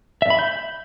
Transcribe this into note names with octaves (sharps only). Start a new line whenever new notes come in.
E5
B5
G6